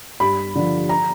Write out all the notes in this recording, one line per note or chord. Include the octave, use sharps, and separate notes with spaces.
G2 B5
D3 F3
A#5